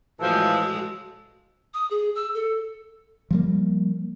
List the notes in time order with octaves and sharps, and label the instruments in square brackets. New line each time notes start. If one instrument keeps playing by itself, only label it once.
[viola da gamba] A2 G#3 [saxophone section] E3 F3 [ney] F#4 [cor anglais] A4
[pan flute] D#6
G#4
E6
A4
[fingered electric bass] F3 G3 A#3